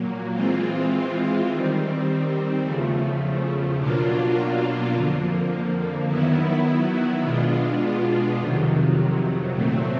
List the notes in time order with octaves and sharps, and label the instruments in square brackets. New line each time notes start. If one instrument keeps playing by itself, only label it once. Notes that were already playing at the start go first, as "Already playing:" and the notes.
Already playing: [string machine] A#2 F#3 A#3
E3 G#3 C4 F4
D#3 G3 C4
E2 C#3 F3 A3
B2 F#3 A#3 D4 F4
F2 D3 F3 A#3
D#3 F#3 B3 E4
B2 G#3 B3 D4 F4
F2 C3 D#3 F#3
A#2 F#3 A3 C4